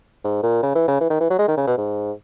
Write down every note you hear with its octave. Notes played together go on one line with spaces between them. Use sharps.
G#2
A#2
C#3
E3
C#3
E3
D#3
E3
F#3
G#3
D#3
C#3
B2
G#2